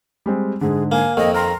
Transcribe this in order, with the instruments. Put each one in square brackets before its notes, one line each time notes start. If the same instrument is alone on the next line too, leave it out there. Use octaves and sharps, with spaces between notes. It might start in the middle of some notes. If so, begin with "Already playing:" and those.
[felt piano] G3 G#3 C4
[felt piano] G#2 D3 [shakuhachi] G#4
[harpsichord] A#3 [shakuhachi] G#5
[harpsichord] F2 D#3 [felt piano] A#3 [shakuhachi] D#5
[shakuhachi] A#5 [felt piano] C6 F6